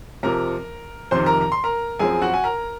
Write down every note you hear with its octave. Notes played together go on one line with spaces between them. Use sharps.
F2 C3 F3 A#4 A#5
F2 C3 D#3 C5 C6
A#4 A#5
A#5
C6
A#4 A#5
F#2 F3 C4 G#4 G#5
F#4 F#5
G#5
A#4 A#5